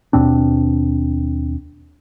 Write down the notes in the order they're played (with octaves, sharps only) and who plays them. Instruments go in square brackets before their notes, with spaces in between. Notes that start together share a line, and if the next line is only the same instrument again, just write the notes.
[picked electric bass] D#2 B2 C4 D4